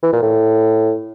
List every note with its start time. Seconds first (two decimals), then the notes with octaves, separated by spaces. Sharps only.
0.03 E3
0.13 A#2
0.22 A2